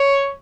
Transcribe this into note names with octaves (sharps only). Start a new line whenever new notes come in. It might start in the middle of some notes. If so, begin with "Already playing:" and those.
Already playing: C#5